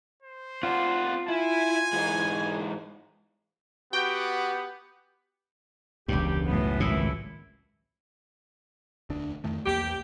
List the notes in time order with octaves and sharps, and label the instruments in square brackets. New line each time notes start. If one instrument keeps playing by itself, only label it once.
[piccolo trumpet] C5
[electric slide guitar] C4 D5 F#5 [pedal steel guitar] F4
[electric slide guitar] E4 [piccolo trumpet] G#5
[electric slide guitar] G#2 E3 G#3
[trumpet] B3 [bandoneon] F#4 [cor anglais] G4 [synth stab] G5
[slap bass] E1 G2 [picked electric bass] C#2 [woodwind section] G4
[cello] F#2 A2 [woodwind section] B3
[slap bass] G#1 A#2 [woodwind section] E3 E4
[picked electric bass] E1 D2 D4
F2 D#3 A3
[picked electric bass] B1 E2 A#3 [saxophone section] G4